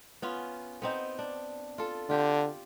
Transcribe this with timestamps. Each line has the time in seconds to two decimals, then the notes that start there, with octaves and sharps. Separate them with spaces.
0.22 B3 C#4 F4
0.82 B3 C4 D#4
1.19 D4
1.78 F4 A4
2.10 D3 F4 G4